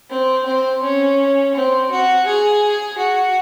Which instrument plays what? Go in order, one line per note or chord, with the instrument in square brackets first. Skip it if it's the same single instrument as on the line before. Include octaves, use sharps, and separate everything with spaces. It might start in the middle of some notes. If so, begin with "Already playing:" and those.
[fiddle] C4
C4
C#4
C4
F#4
G#4
F#4